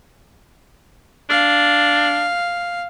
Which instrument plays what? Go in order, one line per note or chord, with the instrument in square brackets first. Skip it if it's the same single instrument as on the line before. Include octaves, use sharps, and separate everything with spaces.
[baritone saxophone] D4 [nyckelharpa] F5